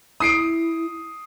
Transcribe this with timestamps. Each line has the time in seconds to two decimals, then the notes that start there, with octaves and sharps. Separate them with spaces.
0.20 E4 D#6 C7 D7